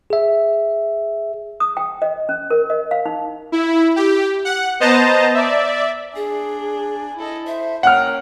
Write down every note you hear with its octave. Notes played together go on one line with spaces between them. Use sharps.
G#4 E5
D#6
G5
D#5
C#4
A#4
D#5
F5
D#4
E4
G4
F#5
B3 C5 D#5 A5 A#5
D5 E5
D4 G#4 G#5
E4 A4 D#5
C5 E5
A#3 C#4 F#5 G5 F6